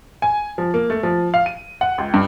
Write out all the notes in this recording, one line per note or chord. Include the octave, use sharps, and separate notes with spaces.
G#5
F3
A#3
A3
F3
F5
D#7
F#5
C#2
G2